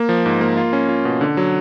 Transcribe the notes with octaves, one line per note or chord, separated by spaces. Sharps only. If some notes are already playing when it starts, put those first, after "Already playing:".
Already playing: A#3
F3
G#2
A#3
F4
C#4
F4
B2
D3
F#3